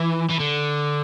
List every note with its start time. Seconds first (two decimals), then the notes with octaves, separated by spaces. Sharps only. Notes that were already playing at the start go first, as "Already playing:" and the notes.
Already playing: E3
0.29 E3
0.39 D3